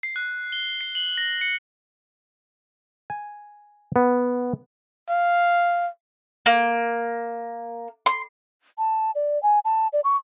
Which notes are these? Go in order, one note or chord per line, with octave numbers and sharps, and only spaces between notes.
C7
F#6
G7
C7
F#7
A#6
C#7
G#5
B3
F5
A#3
C6
A5
D5
G#5
A5
D5
C#6